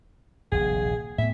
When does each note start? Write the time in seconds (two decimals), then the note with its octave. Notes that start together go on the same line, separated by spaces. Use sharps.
0.52 D#1 A#1 C3 G#4
1.18 A2 B3 E5